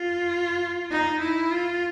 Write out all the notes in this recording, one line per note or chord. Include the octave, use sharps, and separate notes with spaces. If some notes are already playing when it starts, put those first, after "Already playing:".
Already playing: F4
D#4
E4
F4